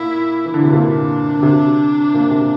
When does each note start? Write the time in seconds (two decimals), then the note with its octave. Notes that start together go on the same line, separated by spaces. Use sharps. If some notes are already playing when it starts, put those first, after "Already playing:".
Already playing: A#2 E4
0.46 E3
0.54 D3
0.64 C3
0.72 A#2 D4
1.39 D3
1.43 C3
2.14 A#2
2.31 C3